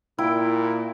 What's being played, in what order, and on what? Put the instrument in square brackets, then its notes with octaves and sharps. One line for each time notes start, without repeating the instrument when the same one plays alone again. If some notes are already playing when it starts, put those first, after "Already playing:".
[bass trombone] A#2 [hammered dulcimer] E4 G5